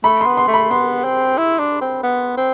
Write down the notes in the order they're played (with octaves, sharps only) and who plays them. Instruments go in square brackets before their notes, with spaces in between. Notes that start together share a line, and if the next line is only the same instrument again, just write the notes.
[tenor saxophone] A3 [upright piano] B5
[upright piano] C6
[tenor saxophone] B3
[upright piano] C6
[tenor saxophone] A3
[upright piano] B5
[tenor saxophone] B3 [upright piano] C6
[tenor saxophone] C4
E4
D4
C4
B3
C4